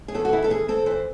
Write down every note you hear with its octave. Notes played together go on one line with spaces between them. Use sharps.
G#4
E2 A4
F#4
E3 E4
A4
E2 G#4
C4 A4
E3 C5